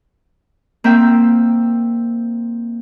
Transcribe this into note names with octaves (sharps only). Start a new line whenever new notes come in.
A#3 C4 E5 G5